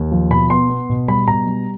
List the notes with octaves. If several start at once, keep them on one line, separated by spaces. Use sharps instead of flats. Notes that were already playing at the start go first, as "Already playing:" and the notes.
Already playing: D#2
F3
B2 B5
B3 C6
B3
B2
G3 B5
B2 A#5
G3